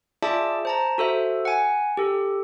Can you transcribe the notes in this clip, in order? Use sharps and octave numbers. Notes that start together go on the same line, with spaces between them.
F4 G#4 D5 E5 A5 D6
C5 A5 A#5
F#4 A4 C5 E5
F#5 G#5
G4 A4